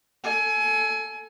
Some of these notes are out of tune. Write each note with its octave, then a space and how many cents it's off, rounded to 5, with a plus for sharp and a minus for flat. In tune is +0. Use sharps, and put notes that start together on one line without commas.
A4 +0 G#5 +25